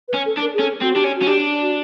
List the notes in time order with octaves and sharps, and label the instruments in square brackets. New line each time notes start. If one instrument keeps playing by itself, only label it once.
[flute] B4
[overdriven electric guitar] C#4
[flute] A4
[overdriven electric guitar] D4
[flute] A#4
G#4
[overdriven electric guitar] C#4 [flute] A4
[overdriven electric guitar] C4 [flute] F#4
[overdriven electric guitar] D4 [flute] G4
[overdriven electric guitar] C#4
[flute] F#4
[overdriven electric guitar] C#4
[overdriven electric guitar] D4 [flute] G4
[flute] F#4